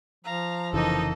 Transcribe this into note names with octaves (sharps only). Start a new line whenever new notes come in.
F3 F5 A#5
F1 C#3 E3 A#3 D#4 A4 D#5